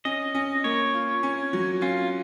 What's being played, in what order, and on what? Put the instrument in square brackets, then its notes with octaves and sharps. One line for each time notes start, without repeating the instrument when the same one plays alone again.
[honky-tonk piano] C#4 [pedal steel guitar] D#5
[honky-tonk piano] C#4
[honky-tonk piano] A#3 [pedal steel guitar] C#5
[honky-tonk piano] F4
C#4
F#3
[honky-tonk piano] C#4 [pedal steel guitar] F4